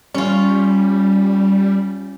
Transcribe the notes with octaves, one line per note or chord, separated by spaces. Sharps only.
G3 C#4 F4